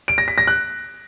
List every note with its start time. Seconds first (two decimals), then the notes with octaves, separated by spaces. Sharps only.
0.08 D7
0.18 A#6
0.28 B6
0.38 A#6
0.47 F#6